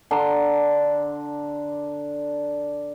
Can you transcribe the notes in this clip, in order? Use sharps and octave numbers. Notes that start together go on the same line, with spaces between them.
D3 D4 A#5 C6